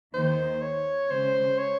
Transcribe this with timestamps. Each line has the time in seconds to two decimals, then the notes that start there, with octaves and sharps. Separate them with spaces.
0.14 D#2 D#3 A#3 D#4 C5
0.61 C#5
1.10 C#3 G#3 C#4 C5
1.58 C#5